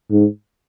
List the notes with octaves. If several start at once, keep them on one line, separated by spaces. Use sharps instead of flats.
G#2